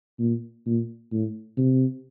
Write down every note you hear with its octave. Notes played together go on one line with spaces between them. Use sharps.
A#2
A#2
A2
C3